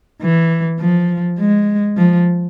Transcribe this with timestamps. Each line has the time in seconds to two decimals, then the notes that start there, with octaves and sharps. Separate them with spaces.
0.22 E3
0.80 F3
1.39 G#3
1.97 F3